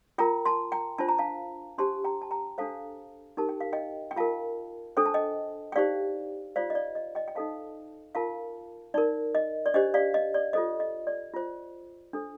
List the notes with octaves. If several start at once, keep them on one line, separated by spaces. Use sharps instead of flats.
F4 A#4 G5 A#5
A5 C6
G5 A#5
D4 F4 C5 A5
A#5
F5 A5
D4 G4 C5 A5 C6
G5 A#5
A5
G5 A#5
D4 A4 C5 F5 A5
D#4 G4 A#4 A5
G5
F5
D#5 G5
G5
F4 A#4 F5 A5
D4 A4 C5 G5
A5
D#5 G5
G5
D#4 G4 C5 D5 F5
F4 C5 D5 F5
D#5
D5
D#5
D#5 G5
G5
D#4 A4 C5 F5 A5
F4 A#4 F5 A5
D#4 A#4 D5
D#5
D5
D4 G4 C5 D#5
D5 F5
D#5
D5
F4 A4 C5 D#5
D#5
D5
F4 C5
D4 A4 C5